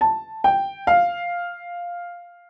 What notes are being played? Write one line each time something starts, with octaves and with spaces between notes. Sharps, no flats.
A5
G5
F5